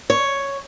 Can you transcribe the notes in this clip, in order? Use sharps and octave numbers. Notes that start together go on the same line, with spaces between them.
C#5